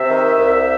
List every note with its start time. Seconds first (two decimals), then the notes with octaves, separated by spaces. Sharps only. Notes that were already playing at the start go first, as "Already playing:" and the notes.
Already playing: C3 E5
0.10 D#3
0.37 C2